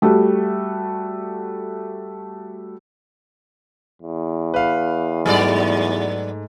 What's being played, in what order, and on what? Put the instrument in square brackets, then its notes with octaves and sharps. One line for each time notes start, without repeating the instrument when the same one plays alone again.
[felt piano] G3 A3 F#4
[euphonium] E2
[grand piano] B4 F5
[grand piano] G#2 A3 [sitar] F#3 B3 D5